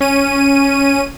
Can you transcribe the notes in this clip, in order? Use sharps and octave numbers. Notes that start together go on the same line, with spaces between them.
C#4 D#7